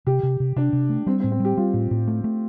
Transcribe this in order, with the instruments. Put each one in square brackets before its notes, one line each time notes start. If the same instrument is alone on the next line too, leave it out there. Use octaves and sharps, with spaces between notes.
[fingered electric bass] C3 [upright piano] G4
[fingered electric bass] C3
C3
[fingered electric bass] C3 [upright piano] D4
[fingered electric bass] C3
A3
[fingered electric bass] G3 [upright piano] C4
[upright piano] C4
[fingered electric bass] A2
[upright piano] C4
[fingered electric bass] G3 [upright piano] G4
[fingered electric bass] G3 [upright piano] F4
[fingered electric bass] A2
A2
A3
A3